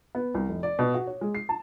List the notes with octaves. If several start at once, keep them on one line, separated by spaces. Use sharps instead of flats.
B3
C2
F1
D5
B2
F#4
C#5
G#3
C7
A5